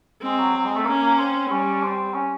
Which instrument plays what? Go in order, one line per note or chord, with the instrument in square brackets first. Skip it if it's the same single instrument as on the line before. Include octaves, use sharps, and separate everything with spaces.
[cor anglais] G#3 [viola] C4
[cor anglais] F#3
F#3
G#3
A3
[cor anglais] A#3 [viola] C#4
[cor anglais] A#3
C4
[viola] G3 [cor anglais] C#4
[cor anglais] C4
C#4